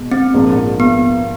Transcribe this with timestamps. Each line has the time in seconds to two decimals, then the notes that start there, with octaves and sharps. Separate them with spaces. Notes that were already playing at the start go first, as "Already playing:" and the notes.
Already playing: B2 G#3
0.11 C4
0.34 A#1 G#2 F3 A#3 D4
0.80 B3